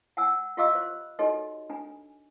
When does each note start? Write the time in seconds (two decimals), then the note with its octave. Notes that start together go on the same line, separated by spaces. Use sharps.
0.17 F#5 G#5 E6
0.57 F4 G4 D#5 F5 D6 E6
0.75 C5
1.19 D#4 F#4 G4 A4 C#5 D#5
1.70 D4 G#5